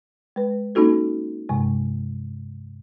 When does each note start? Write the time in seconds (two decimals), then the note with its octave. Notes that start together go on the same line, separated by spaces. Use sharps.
0.36 G#3 B4
0.75 A#3 C#4 D#4 F#4 A4
1.49 G2 C3 G#3